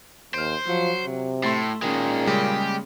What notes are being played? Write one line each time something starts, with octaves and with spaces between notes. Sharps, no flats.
D#2 C5 F6 D7
F3 F#3
C3
A2 A3 C6 A6
A#2 D#3 G#3 A#3 C#4 G#4
C#3 G3 G#3 G4